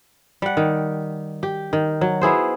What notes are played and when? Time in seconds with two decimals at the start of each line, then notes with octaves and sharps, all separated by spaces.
0.42 G3 F#5
0.57 D#3
1.43 G4
1.73 D#3
2.01 F#3
2.21 B3 E4 G#4 C5